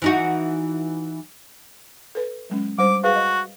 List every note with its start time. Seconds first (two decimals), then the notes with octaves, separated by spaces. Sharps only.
0.02 E3 D#4 F#4
2.15 A4 B4
2.50 F#3 G#3 C#4
2.78 G3 D4 C5 D6
3.04 F#4 G#4 B4 F5
3.16 D#5